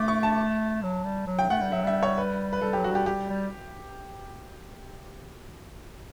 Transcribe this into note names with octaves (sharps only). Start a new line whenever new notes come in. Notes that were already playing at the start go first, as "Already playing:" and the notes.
Already playing: A3 D6
C#6
A5
F#3
G3
F#3
G5
A3 F#5
G3
F#3 E5
G3 E5
C#5
B4
B4
G3 A4
F#3 G4
F#3 F#4
G3 G4
G3 G4
G3